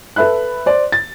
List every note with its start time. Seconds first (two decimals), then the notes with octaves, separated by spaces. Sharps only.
0.16 A4 B4 E5 B5 F#6
0.66 C5 D5
0.92 A6